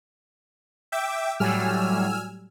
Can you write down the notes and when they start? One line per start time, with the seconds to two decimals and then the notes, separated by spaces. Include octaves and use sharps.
0.92 E5 G5 D6
1.40 A2 F#3 G3 G#5 E6 F6